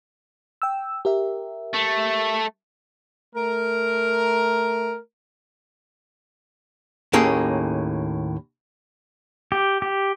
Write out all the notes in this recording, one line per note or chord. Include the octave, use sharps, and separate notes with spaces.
G5 E6
G4 A#4 E5
A3
A3 A#4
D#2 A2 A#3 C#4 G#4 A4
G4
G4